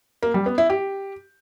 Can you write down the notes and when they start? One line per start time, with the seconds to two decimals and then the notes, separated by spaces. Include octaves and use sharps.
0.23 A#3
0.34 G3
0.46 B3
0.58 E4
0.70 G4